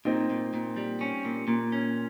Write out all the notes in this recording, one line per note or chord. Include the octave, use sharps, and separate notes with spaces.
A#2 C4 D#4
A#2
A#2
G3
C#4
A#2
A#2
C#4